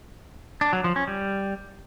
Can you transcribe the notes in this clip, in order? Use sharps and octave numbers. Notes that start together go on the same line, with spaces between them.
D4
F#3
F3
C#4
G3